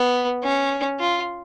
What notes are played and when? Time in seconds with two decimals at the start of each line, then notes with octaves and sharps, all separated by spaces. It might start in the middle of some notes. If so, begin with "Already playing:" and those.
Already playing: B3
0.43 C#4
1.00 F4